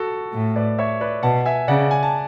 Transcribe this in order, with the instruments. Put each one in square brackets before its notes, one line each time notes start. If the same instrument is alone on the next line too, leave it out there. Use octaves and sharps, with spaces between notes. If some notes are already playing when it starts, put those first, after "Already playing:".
Already playing: [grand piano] F#4 A4
[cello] A2
[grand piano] B4 D5
C#5 E5
B4 D5
[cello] B2 [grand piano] F#5 A5
[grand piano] E5 G#5
[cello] C#3 [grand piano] D5 F#5
[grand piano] G#5
A5